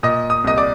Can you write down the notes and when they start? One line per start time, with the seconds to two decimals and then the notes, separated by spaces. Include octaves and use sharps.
0.03 A#2 D#5 D#6
0.30 D#6
0.44 C2 D#5 D#6
0.58 D5 D6